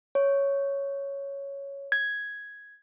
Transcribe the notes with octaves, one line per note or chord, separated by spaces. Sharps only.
C#5
G#6